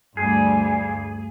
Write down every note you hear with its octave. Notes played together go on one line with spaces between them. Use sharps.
D2 G2 G3 G#4